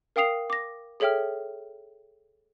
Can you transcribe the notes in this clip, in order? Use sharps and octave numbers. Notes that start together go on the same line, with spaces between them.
A#4 F5 G5 D#6 C7 F7
D6 A#6
G#4 A4 C#5 E5 G5 F6